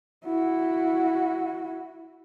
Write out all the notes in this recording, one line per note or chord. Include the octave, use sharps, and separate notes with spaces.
E4 F#4